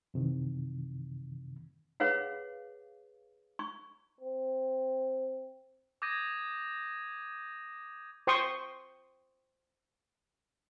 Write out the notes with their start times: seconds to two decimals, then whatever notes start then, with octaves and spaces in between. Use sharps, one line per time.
0.14 F#2 C3 D#3 E3
2.00 G#4 B4 C#5 F5 F#5
3.59 C#6
4.20 C4
6.02 D6 D#6 G6 G#6 A#6 D#7
8.27 C5 G5 C6 C#6 D#6